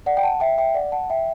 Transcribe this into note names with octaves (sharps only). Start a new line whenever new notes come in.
D5 F#5
G5
F#5 A5
E5 G5
E5 G5
D5 F#5
F#5 A5
E5 G5